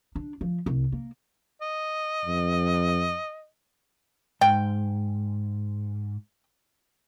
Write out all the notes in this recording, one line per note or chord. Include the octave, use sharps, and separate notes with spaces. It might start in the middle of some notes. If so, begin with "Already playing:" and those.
D4
F3
C2
A#3
D#5
F2
G#2 G5